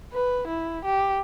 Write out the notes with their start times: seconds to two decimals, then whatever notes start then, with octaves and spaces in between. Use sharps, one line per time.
0.13 B4
0.47 E4
0.85 G4